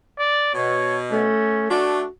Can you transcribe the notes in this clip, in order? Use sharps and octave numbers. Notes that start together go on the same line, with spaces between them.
D5
B2 C#5
A3 C#4
A3 D4 F#4